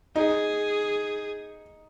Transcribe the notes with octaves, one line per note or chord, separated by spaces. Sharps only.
D#4 G#4